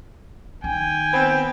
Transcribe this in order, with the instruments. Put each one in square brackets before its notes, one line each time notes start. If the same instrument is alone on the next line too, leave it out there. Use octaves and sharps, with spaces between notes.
[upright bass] D#3 [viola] G5 [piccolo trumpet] G#5
[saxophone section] B3 C4